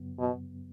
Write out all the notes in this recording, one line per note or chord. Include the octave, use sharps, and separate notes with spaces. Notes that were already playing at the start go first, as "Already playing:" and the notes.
Already playing: F#2 C#3 F#3 B3
B2